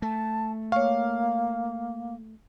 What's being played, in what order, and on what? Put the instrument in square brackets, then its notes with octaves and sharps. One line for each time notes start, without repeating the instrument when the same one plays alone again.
[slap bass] A3 [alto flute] A5
[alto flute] A#3 [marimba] C#5 C#6 [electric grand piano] F5